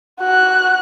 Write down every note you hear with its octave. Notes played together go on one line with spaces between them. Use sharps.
F#4 F#6